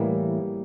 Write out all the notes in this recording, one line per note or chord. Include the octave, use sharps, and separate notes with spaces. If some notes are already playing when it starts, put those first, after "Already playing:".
Already playing: A2 E3 G3 A#3